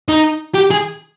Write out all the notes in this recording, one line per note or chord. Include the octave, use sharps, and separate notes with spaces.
D#4
G4
G#4